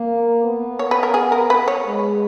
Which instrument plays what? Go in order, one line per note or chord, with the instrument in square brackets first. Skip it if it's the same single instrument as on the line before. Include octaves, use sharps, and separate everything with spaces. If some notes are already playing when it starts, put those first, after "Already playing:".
Already playing: [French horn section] A#3
B3
[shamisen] C#5
B4
A#4
G#4
A#4
B4
C#5
[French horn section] G#3